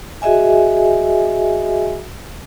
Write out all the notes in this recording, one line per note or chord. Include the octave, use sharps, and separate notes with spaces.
F#4 G#4 D#5 E5 G#5